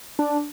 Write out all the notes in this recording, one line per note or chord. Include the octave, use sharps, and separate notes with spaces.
D4